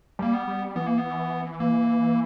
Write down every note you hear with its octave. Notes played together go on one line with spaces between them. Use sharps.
G3 A#3
B3
G3
E3 B3
A#3
B3
A#3